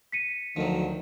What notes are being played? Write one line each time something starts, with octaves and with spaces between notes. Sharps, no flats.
B6 C#7 D#7
D2 D#3 F3 F#3